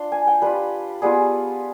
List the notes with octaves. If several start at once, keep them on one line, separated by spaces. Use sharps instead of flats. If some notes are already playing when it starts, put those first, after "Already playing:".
Already playing: D4 F4 C6
G#5
G5
G3 D4 F4 B4
G3 B3 F4 G#4